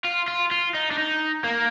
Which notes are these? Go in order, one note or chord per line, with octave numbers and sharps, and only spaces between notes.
F4
F4
F4
D#4
D4
D#4
A#3